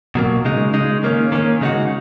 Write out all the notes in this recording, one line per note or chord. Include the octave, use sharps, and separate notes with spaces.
B2 F#3 A#3
C#3 G#3 D#4
C#3 G#3 D#4
D#3 A#3 C#4
D#3 A#3 C#4
C#3 G#3 D#4 F#4